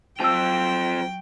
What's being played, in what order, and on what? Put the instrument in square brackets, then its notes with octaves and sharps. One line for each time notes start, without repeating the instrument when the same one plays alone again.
[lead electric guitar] F3 C4 [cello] F#3 G5 [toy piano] A5 E6